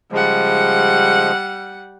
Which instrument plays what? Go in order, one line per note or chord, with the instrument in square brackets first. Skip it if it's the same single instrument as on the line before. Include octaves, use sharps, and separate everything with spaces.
[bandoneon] C#3 F3 G#3 [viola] G3 F#5